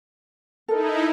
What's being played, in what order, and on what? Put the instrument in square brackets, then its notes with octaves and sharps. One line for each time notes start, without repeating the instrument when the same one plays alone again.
[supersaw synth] D#4 E4 [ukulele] A4 A#4